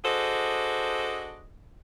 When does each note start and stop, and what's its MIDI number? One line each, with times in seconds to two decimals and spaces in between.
0.05 1.46 62
0.05 1.46 66
0.05 1.46 68
0.05 1.46 69
0.05 1.46 72
0.05 1.46 75